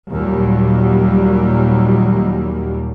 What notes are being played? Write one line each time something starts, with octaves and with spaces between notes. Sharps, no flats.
D#2 A#2 F#3 G3